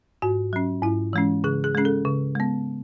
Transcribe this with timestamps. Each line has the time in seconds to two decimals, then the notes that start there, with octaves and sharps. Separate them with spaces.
0.22 G#2 F#4
0.53 F#3 C#4
0.83 G#2 E4
1.13 E3 G#3 C#4
1.44 C#3 G#4
1.64 G#4
1.75 G#3 C#4 G#4
1.85 A4
2.05 C#3
2.35 G#3 B3